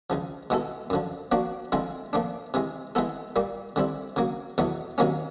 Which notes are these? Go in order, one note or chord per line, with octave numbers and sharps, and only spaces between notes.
C#2 C#3 F3
B2 G#3 B3 E4 A4
F#2 D3 F3
F3 A#3 D4 F#4
D3 F3 G#3 C4 E4
A#2 F3 A3 D4
C3 E3 G#3
E3 G#3 B3 E4 A4
A#2 G3 A#3
D3 G3 C4 E4
C#3 F#3 A#3
E2 B2 F#3 A3
C3 D#3 F#3 A#3 C#4